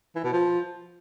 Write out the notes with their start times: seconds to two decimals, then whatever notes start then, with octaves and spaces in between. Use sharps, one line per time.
0.15 E3
0.24 B2
0.33 F3